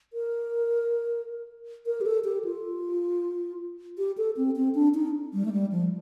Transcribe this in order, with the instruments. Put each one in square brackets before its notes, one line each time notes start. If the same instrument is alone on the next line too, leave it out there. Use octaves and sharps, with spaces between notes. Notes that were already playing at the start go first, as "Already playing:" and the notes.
[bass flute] A#4
A#4
G4
A4
G4
F4
G4
A4
C4
C4
D4
D#4
G3
A3
G3
F3